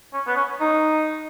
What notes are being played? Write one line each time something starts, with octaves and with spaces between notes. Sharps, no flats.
C#4
B3
C#4
D#4